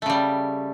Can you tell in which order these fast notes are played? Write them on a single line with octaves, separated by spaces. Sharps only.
A3 C#3 G3